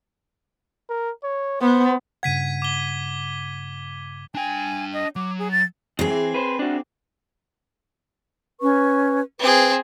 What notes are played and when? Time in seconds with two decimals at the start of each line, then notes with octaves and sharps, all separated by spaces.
0.90 A#4
1.24 C#5
1.61 B3 C5
2.23 G2 C#3 F#5 G#6 B6 D#7
2.62 D6 G7
4.35 D4 G5 G#5
4.93 D#5
5.16 F#3 D6
5.39 G#4
5.52 A6
5.99 D#3 F#3 C4 G#4
6.10 E3
6.34 B4 C5
6.59 D4 F#4
8.60 C#4 B4 C#6
9.39 C4 G#4 B4